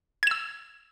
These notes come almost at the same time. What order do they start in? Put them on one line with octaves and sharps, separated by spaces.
G#6 E7 E6